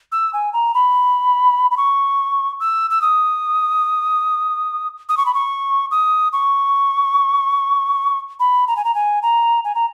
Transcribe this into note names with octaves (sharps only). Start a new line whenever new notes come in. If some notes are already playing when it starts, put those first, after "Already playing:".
E6
G#5
A#5
B5
B5
C#6
E6
E6
D#6
D#6
C#6
B5
C#6
D#6
C#6
B5
A#5
G#5
A#5
G#5
A#5
G#5
A#5